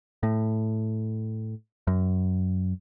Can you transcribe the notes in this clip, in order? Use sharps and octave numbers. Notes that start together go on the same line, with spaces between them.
A2
F#2